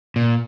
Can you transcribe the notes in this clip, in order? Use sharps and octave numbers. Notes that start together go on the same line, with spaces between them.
A#2